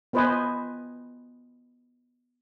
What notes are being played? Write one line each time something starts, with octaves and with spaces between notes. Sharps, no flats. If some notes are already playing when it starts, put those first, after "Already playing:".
B3 F4 B4 C5 D#5 G#5